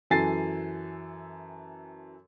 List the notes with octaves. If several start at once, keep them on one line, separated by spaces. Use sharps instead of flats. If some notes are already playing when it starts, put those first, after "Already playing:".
F#2 E3 A4 G#5 A6 C7